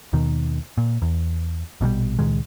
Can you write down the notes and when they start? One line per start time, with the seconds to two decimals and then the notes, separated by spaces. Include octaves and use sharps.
0.13 D#2 B2 D#3
0.78 A#2
1.02 E2
1.81 A#1 B2 F3 G3
2.19 C#2 A#2 D#3 G#3